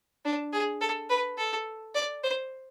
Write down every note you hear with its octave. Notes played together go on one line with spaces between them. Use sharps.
D4
G#4
A4
B4
A4
D5
C5